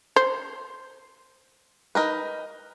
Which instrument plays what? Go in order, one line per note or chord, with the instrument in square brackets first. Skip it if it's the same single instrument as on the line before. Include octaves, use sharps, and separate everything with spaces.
[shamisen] C5
[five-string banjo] D#4 A#4 B4